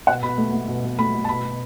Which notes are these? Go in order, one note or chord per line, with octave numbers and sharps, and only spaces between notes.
B2 F#5
B2 B5
A3
A3
B2
B2
A3 B5
A3
A5
B2 B5
B2